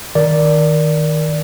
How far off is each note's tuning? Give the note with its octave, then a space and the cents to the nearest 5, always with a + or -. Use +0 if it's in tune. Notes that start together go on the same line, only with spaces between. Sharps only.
D#3 +0 A#4 +10 D5 -5